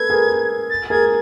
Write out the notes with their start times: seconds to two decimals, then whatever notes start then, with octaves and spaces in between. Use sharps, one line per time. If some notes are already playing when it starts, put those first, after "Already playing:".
Already playing: A4 B4 G#6
0.10 G#4 A#4
0.70 A6
0.90 G#4 A#4 G#6